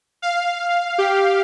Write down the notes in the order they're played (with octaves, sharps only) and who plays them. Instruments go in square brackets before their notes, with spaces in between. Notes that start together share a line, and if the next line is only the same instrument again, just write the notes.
[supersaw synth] F5
G4